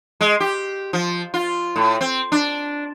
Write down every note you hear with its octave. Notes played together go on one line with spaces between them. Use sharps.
G#3
G4
F3
F4
A2
C4
D4